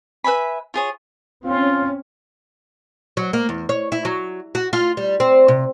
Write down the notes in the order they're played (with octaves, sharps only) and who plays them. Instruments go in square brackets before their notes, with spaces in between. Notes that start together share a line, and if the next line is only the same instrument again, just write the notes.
[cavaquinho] B4 E5 G#5 B5
F4 G#4 C#5
[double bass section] C4 C#4 [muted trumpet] F4
[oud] F#3
A#3
E2
C#5
E4
F#3
F#4
F4
G3
C4
C3